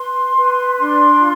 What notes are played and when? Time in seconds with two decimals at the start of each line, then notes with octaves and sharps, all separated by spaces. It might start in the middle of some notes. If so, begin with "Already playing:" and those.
Already playing: B4 C6
0.35 B4
0.78 D4 C6
1.20 F4